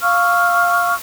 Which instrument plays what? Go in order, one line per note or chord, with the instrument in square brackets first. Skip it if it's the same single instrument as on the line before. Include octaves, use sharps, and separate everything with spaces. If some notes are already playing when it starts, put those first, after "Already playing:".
[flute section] F5 C#6 E6 F6